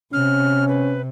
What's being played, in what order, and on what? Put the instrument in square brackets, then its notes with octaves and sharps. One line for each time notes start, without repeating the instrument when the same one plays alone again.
[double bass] C3 [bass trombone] C#4 [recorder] F6
[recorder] B4